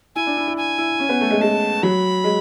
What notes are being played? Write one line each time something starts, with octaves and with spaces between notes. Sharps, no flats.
E4 G#5
D4
E4
E4
G#5
E4
C#4
B3
A3
G#3
G#3 A5
F#3 B5
G#3